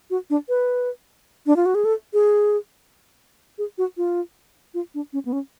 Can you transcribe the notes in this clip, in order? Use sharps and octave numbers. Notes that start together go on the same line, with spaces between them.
F#4
D4
B4
D4
F4
F#4
G#4
A4
G#4
G#4
F#4
F4
F4
D4
C#4
B3
C#4